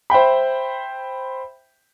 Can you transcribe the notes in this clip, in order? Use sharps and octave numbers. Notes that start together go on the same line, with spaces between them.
C5 E5 G5 B5